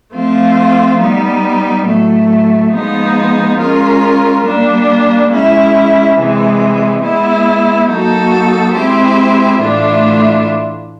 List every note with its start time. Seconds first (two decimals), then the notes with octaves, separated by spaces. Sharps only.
0.15 F3 A3 C4 F4
1.00 G3 B3 D#4
1.86 A2 F#3 A3
2.73 F3 G#3 B3 D#4
3.59 G#3 C#4 F4 A#4
4.45 G3 A#3 D4
5.31 G#3 C#4 E4
6.17 C3 E3 G#3
7.03 G#3 B3 E4
7.89 F#3 A#3 D#4 F#4 A4
8.75 G#3 C4 E4 G4 C5
9.61 A2 E3 A3 D4 F4